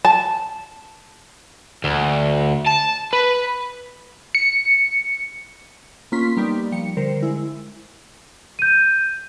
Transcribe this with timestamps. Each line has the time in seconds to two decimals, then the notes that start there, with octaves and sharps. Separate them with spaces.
0.05 A5
1.84 D2
2.67 A5
3.13 B4
4.35 C#7
6.12 A#3 C#4 F4 C6 B6
6.37 G3 A#3 B3 D#4 G4 D5
6.72 F3 G3 C#7
6.97 D3 G3 A#4 C5
7.23 G#3 E4
8.59 G6 D#7